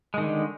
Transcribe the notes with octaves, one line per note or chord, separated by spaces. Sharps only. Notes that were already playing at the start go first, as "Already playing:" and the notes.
D3 D#3 G#3